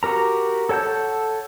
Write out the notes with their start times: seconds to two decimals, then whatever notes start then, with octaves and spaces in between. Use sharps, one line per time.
0.03 F#4 G4 A#4 A#5
0.69 A4 C#5 F#5 A5 G6